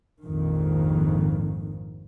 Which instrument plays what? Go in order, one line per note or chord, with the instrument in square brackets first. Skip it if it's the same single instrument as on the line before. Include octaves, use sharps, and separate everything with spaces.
[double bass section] A#1 F2 G#2 D#3